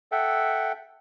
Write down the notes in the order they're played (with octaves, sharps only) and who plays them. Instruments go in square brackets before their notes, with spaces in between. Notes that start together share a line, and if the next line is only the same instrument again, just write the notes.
[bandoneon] A4 E5 F#5 G5